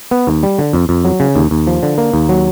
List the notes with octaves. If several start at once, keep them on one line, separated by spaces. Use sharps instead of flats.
B3
D#2
G3
D3
F2
F2
F#3
C#3
D#2
D#2
F3
D3
A#3
D#2
F#3